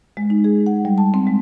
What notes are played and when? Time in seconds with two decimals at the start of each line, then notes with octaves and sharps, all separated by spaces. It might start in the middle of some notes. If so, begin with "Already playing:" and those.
0.17 G#3
0.30 D#4
0.44 G#4
0.66 F#5
0.85 G3
0.98 A5
1.14 C4
1.27 G#3